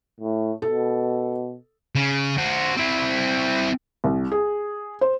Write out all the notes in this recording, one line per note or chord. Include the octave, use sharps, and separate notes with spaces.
A2
B2 A4
C#3
F#4 C5
C4 E4
C2
G#4
C5